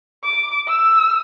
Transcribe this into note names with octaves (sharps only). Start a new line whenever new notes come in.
D6
E6